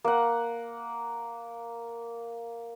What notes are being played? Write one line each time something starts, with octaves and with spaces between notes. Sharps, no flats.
A#3 F#5